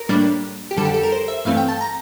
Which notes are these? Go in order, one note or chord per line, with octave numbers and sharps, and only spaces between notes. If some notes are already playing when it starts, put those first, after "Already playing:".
Already playing: A#4
A2 G3 A#3 D4
G4
F2 D3 G3 A4
G4
A4
A#4
C5
E5
G2 E3 A3 C4 F5
G5
A5
A#5